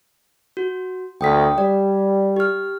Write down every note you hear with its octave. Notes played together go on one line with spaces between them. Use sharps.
F#4
D2 G5 D#6 B6
G3 D5
G4 F6